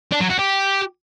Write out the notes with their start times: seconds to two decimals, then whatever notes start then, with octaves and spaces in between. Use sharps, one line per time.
0.12 D4
0.21 F#3
0.30 F#4
0.39 G4